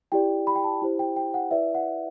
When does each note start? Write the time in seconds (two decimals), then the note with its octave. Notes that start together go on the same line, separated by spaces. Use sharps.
0.12 E4 G4 D5 G5
0.47 B5
0.55 G5
0.64 A5
0.82 E4 G4 C5
0.99 G5
1.16 G5
1.34 F#5
1.51 E4 B4 D5 E5
1.75 F#5